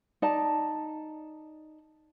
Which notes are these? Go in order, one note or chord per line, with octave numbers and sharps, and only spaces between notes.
D#4 D5 A5